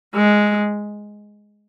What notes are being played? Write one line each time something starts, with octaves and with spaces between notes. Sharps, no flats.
G#3